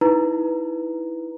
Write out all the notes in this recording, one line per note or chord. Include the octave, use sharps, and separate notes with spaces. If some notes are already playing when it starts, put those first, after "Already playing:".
D#4 E4 B4 A#5